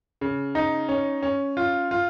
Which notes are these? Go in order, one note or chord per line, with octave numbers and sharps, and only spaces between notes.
C#3
D#4
C#4
C#4
F4
F4